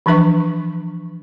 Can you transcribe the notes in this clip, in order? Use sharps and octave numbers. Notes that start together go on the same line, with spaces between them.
E3 F3 D4 B4 E5 C#6